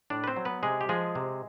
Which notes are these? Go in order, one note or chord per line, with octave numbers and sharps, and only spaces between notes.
A2 D4 D5
B4
C4 C5
F#3
B3 B4
C3 G#3 G#4
G4
F3 G#3 G#4
C3